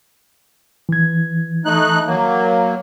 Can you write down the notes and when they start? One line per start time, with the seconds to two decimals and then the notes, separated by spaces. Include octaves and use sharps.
0.89 E3 G#6
1.65 A3 D#4 F#6
2.07 F#3 A#3